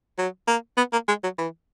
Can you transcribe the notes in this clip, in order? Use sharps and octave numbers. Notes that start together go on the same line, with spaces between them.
F#3
A#3
B3
A#3
G#3
F#3
E3